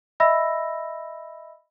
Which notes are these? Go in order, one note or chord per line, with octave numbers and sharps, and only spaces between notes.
D#5 E5 B5 E6 A#6